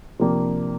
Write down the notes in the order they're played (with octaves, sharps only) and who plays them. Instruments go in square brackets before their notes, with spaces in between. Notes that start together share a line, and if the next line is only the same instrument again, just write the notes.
[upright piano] C3 F3 A#3 D4 G4